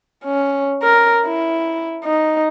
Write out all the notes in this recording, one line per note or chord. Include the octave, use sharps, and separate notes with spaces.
C#4
A#4
E4
D#4